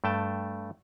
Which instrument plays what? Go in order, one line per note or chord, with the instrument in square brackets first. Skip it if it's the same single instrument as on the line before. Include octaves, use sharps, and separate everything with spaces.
[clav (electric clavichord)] G2 A3 G5 A5